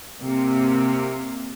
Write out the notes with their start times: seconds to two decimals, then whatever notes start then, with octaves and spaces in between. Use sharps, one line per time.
0.20 C3 A#3